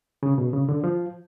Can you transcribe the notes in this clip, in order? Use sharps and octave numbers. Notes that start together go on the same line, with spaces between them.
C#3
B2
C#3
D3
F3